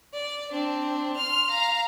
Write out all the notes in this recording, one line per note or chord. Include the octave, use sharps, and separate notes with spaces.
D5
C4 D4
C6 F6
F5 A#5